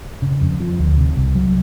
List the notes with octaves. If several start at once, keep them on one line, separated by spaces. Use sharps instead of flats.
C#3
F2
F3
D2
C3
C2
F#3